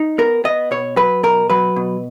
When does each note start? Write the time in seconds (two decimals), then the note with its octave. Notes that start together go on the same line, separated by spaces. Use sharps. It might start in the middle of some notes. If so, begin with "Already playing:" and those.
Already playing: D#4
0.18 B3 A#4
0.44 B3 D#5
0.71 B2 C#5
0.97 F#3 B4
1.23 B2 A#4
1.50 F#3 B4
1.76 B2